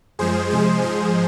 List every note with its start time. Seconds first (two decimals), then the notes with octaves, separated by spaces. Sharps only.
0.19 F#2 F3 G#3 G#4 C5
0.51 C3 F3 G#3 G#4 C5
0.82 G#2 F3 G#3 G#4 C5